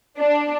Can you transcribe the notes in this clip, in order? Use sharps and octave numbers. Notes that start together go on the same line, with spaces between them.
D4